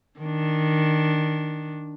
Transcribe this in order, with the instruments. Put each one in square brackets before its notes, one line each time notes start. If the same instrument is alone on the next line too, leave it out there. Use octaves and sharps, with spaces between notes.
[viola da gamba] D#3 D4